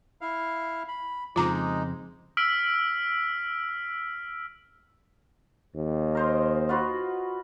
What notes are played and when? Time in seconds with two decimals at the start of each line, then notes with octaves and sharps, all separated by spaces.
0.21 E4 F5
0.88 B5
1.36 F2 C#3 G#3 C4 D#4 F4 A#5 D6
2.37 E6 F6 B6 D7
5.76 D#2
6.15 A#4 C5 D#5
6.69 F4 F#4 B4